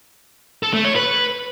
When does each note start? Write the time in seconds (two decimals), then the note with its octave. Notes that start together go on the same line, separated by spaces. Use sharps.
0.63 A4
0.74 A3
0.85 C#5
0.95 B4